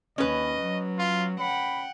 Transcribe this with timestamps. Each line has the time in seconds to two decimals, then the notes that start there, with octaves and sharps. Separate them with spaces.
0.18 D#2 C#4 B4 D#5
0.61 F#3
0.99 F4
1.40 F#5 G5 B5